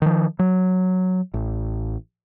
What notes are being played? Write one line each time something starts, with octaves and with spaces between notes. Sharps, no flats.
D#3 F3
F#3
A1